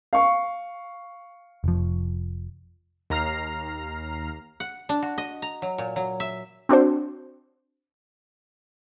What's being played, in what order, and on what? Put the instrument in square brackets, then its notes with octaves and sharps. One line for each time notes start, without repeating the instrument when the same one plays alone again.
[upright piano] F5 C#6
[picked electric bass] F1 F3
[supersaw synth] D#2 A#5 F6 C7
[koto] F#5
D4
F#4
D#5
A#5
F#3
A#2
F#3
E5
[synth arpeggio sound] C4 D4 F#4 C5